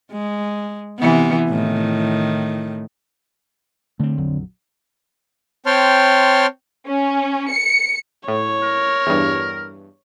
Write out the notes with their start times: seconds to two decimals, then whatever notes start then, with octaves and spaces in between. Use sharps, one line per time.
0.12 G#3
0.99 C3 E3 B3
1.49 A2 D#3
3.99 D3 A3 C4
4.18 A#1 F2 F#3
5.66 C4 C#5 G5 A5 C6 F6
6.87 C#4
7.51 C#7
8.28 A2 C#5
8.63 A#4
9.07 E2 G2